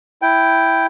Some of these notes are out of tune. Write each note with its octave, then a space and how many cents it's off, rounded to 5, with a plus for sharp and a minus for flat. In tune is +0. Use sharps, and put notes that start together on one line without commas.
E4 +0 G5 -5